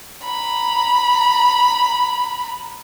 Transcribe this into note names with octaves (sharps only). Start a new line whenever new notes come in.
A#5 B5